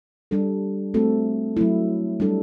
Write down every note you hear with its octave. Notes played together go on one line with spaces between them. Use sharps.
G3 D4 A4
A3 C4 F#4 A4
F#3 A3 E4
G3 D4 A4